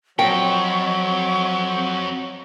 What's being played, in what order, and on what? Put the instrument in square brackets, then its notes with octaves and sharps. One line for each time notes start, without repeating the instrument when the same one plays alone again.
[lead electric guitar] F2 [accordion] F#3 [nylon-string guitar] G5 [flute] C#6